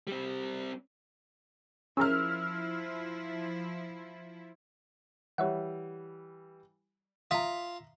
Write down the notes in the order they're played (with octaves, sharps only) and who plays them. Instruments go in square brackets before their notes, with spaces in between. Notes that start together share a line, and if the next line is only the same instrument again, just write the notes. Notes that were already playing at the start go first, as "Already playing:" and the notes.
[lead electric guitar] G3 C4
[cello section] F3 E4 [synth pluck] C#4 G#4 A#4 [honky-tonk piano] E6 F6
[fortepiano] E3 G3 [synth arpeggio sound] C#5 E5 F#5
[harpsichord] F4 [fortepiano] E5 A#5 [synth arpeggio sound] D#6 B6